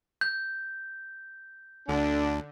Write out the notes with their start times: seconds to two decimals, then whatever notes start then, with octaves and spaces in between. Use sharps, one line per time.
0.21 G6
1.88 D2 D3 D4